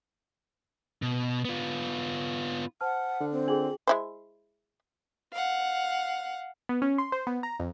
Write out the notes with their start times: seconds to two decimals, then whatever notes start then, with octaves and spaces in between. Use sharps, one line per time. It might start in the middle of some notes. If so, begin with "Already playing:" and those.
1.02 B2
1.45 B3 F4
2.81 C5 F#5 A5 F6
3.20 D3
3.32 C4
3.47 D4 F4 G#4 G5 F#7
3.87 G#3 E4 C5
5.33 F5 F#5
6.69 B3
6.82 C#4
6.98 C6
7.12 C5
7.27 B3
7.43 A#5
7.60 F2